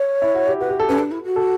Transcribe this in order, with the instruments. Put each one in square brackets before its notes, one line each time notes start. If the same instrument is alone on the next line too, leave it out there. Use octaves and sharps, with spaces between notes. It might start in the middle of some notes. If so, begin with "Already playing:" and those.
Already playing: [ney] C#5
[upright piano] E4
F#4
G4
[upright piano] F#4 [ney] B4
[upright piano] G4
A4
[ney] C#4 [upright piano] B4
[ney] D4
E4
F#4
[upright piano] A4